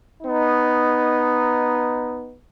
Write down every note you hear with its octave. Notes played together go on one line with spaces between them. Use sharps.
B3 D#4